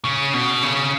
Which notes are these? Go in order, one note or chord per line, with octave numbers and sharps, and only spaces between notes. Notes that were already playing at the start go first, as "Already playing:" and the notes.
C#3
B2
C#3